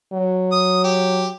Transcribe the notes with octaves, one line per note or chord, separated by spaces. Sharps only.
F#3
D#6
G4